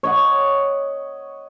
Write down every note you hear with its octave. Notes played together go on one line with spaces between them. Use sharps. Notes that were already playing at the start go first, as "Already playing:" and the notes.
C#5 D#5 F#5